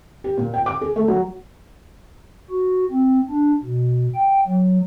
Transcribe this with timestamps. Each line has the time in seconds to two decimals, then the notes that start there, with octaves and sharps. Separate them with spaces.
0.24 G4
0.37 A#2
0.54 G5
0.66 D6
0.81 G#4
0.96 A3
1.08 F#3
2.50 F#4
2.91 C4
3.29 D4
3.64 B2
4.14 G5
4.47 F#3